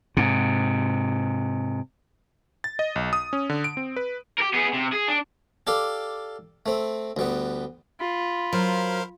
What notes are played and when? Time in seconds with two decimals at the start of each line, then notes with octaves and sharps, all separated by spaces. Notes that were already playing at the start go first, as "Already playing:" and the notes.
0.17 G#2 C3
2.64 A6
2.79 D#5
2.96 B1
3.13 D#6
3.33 C#4
3.49 D3
3.64 D7
3.77 C4
3.96 B4
4.39 G4 A#4
4.54 B3 G#4
4.74 C3
4.93 G#4
5.08 D4
5.67 G4 A4 D5 F5
6.66 A3 C4
7.17 D2 G3 B3
8.00 F4 B5
8.53 F#3 A#4 C5 F5